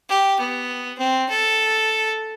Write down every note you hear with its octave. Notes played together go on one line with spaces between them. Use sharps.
G4
B3
C4
A4